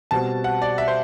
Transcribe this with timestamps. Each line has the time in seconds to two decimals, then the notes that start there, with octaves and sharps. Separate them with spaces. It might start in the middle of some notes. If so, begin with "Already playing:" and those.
0.11 B2 G3 C4 F#4 A5
0.44 F#5
0.62 D5
0.78 E5
0.88 C5